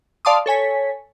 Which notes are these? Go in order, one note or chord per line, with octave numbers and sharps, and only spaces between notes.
D5 F5 A5 C6 D6 D#6
A4 C#5 G#5 B6